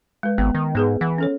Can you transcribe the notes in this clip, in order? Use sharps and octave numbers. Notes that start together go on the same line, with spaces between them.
G#3 B4
G#1 B3
D#3
G#2 B3 G#4 B4
E3 F#5
C#4 A4 C#5